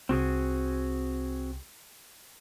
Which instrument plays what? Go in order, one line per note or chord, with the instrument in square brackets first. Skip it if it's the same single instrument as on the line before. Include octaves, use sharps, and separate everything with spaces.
[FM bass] C2 [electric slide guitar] C4 F#4 G#4